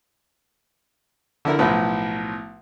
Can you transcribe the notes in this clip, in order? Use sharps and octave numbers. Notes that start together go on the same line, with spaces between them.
D3 E4 A#4
B1 A2 F3 B4